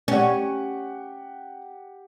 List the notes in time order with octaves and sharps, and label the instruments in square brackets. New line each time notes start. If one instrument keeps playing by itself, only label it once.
[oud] C#4 [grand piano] G4 F#5